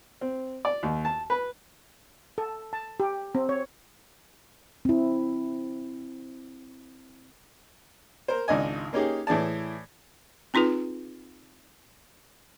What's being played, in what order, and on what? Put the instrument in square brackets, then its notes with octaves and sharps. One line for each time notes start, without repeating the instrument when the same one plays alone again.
[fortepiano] C4
D5
D#2
A5
B4
[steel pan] A4
A5
G4
C4
C#5
[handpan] C4 E4
[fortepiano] A#4 C5
G#1 C#2 D4 D#5 G#5
A#3 C#4 D#4 G4 G#4
A2 E3 G#4 D5 A5
[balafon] C4 D#4 F4 G#4 B4